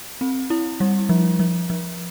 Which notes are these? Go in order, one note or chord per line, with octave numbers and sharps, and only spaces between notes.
C4
E4
G3
F3
F3
F3